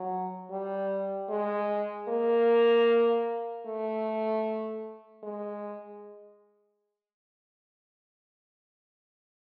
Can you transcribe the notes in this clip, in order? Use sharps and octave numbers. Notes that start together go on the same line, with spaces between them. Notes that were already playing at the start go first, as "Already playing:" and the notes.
Already playing: F#3
G3
G#3
A#3
A3
G#3